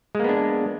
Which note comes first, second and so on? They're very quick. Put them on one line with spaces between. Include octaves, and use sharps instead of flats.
G#3 A#3 B3 D4